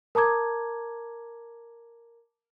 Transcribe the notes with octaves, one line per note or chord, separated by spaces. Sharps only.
A#4 A5 A#5 D6 G#6